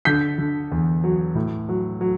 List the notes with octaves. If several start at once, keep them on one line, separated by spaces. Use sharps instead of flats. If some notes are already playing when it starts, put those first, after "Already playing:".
D3 G6 B6
D3
E2
F#3
A2
F#3
F#3